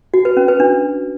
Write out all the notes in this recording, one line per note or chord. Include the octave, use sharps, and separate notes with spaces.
F#4
B4
C#4
B4
D4